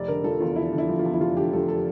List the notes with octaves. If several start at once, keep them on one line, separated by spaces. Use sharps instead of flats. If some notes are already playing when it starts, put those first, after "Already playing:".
Already playing: F1 D5
D3 A#4
F3 A4
E2 F4
F1 E4
D3
E4
F3
F4
E2
E4
F1 F4
D3 G4
F3 A4
A4